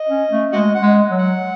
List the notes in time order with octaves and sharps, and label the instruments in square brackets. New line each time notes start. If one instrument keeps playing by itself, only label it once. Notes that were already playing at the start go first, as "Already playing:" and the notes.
Already playing: [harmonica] D#5
[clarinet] C#4
A3
[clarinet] G#3 [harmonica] F#4 D#5
[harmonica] F#5
[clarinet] G#3
F#3
[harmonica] F#5